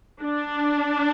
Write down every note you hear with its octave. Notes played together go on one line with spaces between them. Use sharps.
D4